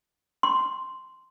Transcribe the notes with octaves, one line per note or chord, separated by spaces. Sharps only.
C6